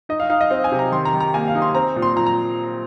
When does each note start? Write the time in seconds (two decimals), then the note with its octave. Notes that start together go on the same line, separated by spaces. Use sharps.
0.09 D#4 D#5
0.20 F5
0.30 D#4 F5
0.41 D#5
0.50 C4 F5
0.64 G#5
0.72 C3
0.79 A#5
0.92 D#3 C6
1.05 A#5
1.13 D#3
1.20 A#5
1.34 A#3 G#5
1.48 F5
1.55 D#4
1.62 C6
1.75 C4 A#5
1.96 A#2
2.02 C6
2.16 A#2 A#5
2.26 A#5